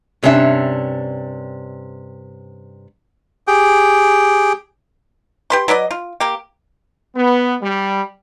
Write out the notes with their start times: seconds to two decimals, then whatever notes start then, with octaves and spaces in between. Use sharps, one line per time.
0.23 G2 C3 C#4 D4 E5
3.48 G4 G#4 G5
5.50 G4 B4 C6
5.68 F#3 B4 D5 D#5
5.91 F4
6.20 A#3 G4
7.16 B3
7.62 G3